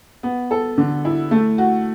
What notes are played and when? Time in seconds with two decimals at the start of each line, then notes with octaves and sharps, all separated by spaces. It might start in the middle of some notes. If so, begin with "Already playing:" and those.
0.23 B3
0.51 A4
0.78 D3
1.05 E4
1.31 A3
1.58 F#4